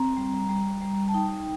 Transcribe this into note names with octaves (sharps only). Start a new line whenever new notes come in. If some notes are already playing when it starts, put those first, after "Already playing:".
Already playing: C4 A#5
G3
G3
G3
A5
D#4 G5